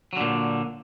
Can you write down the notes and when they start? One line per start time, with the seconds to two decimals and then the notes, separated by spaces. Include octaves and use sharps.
0.13 F#3
0.17 D3
0.20 A#2